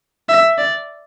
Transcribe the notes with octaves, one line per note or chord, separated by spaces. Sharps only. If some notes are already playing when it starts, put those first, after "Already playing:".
E5
D5